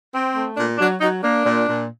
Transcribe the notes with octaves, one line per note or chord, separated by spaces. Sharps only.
C4
A3
A#2 D4
F#3 D4
F#3 D#4
A#3 D4
A#2
A#2